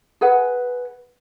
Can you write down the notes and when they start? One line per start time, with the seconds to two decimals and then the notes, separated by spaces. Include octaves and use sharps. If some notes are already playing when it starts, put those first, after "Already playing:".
0.21 G#4 B4 F#5